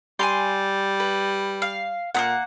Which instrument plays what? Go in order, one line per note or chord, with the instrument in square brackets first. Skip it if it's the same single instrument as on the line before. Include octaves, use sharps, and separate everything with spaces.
[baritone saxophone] G3 [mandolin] G#5 A#5 C6
[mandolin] B4
F5
[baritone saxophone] A#2 [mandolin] A#3 B3 F#5